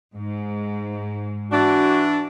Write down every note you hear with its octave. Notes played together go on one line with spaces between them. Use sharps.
G#2
E3 D4 F#4